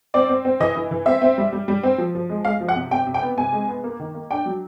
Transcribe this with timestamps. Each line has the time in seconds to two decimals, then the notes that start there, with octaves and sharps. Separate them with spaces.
0.14 C4 D5
0.29 C4
0.45 C4
0.60 E3 D#5
0.76 E3
0.91 E3
1.06 C4 E5
1.22 C4
1.38 G3
1.53 G3
1.68 G3
1.83 C4
1.98 F3
2.15 F3
2.29 G#3
2.45 G#3 F5
2.61 F3
2.69 F#5
2.76 C3
2.91 C3 G5
3.07 C3
3.14 G5
3.22 B3
3.38 C3 G#5
3.53 G#3
3.68 B3
3.84 A#3
4.00 D#3
4.14 A#3
4.31 D4 G5
4.46 F#3